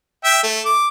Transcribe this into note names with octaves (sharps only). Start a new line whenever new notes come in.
E5 G5
A3
D6